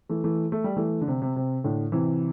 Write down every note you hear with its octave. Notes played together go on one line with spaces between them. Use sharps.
E3 A3
E3 A3
A3
G3
E3 A3
D3
C3
C3
C3
A2 D3
C3 E3